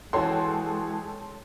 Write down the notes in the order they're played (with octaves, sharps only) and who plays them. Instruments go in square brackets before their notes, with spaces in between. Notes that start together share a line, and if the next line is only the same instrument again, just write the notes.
[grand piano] E3 F#4 [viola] G#3 [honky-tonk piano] A4 G5 A5 [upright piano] C#5 C6